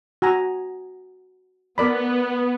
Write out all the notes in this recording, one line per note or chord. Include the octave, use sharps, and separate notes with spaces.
F#4 G#5 A#5
B3 A#4 D5 B5